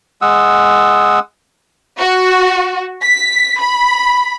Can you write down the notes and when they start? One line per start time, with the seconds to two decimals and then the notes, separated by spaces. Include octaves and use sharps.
0.22 G#3 F#5 D#6 E6
1.99 F#4
3.03 B6
3.61 B5